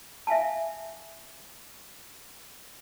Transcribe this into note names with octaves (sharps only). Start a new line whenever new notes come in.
E5 F5 G#5 A5